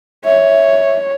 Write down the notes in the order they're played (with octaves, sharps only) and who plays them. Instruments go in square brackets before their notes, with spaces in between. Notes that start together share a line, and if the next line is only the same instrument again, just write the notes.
[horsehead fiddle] C#5 [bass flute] E5